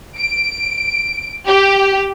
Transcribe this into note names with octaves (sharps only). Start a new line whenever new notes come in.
D7
G4